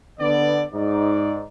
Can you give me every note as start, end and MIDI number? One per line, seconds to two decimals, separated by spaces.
0.20 0.64 50
0.20 0.64 59
0.20 0.64 74
0.73 1.44 44
0.73 1.44 63
0.73 1.44 74